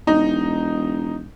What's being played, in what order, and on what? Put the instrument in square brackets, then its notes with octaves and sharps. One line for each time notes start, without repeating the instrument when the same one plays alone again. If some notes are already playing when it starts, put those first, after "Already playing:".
[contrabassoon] E1 [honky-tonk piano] D#4